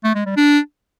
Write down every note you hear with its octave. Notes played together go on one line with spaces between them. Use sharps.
A3
G#3
G3
D4